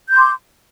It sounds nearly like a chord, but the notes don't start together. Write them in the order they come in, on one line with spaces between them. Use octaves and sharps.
G6 C6 D6